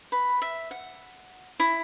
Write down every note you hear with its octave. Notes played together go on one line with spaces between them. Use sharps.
B4
E5
F#5
E4